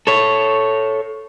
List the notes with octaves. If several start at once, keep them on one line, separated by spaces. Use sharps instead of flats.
A4 C#5